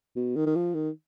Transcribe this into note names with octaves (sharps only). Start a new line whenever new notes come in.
B2
D#3
D#3
F3
D#3